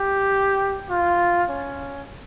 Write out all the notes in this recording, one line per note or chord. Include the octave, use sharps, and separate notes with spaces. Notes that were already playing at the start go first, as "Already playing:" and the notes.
Already playing: G4
F4
C#4